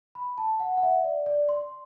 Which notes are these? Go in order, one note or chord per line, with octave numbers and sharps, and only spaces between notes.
B5
A5
F#5
F#5
E5
D5
D5
C6